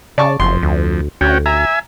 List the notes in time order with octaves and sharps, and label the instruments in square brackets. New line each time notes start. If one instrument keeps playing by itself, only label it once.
[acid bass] C#3 [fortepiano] D5 A5 C#6
[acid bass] F#1 [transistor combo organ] F2 [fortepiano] C6
[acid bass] D2
[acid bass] D2 [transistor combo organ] C#4 F#4 G5
[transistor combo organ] E5 G#5 [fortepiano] A#5